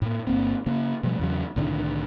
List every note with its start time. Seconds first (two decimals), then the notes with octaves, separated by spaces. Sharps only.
0.02 A2 A#3
0.27 G1 A#2 A#3 C4
0.66 C#3 A#3
1.03 B2 F3 G3 A3
1.19 E2 C#3 F#3
1.56 C2 A2 D3 D#3